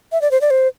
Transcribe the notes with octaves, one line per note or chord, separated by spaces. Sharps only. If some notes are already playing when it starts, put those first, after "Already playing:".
E5
D5
C5
D5
C5